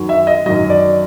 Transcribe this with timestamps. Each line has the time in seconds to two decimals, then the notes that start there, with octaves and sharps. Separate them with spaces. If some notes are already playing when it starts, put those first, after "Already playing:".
Already playing: F#2 D#3 F#3
0.09 E5
0.27 D#5
0.46 F#2 D#3 F#3 D#5
0.70 D5